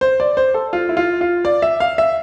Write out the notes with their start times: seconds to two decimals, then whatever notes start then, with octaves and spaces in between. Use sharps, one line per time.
0.01 C5
0.20 D5
0.37 C5
0.54 A4
0.73 F4
0.89 E4
0.97 F4
1.21 F4
1.45 D5
1.62 E5
1.80 F5
1.98 E5